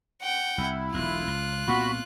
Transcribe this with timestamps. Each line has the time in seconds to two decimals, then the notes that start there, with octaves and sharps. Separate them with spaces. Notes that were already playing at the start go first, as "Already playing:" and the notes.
0.21 F#5 G5
0.58 C2 E4
0.94 E1 B1 F4 F#6
1.27 C#2
1.68 C2 A#2 B3 F#4 B5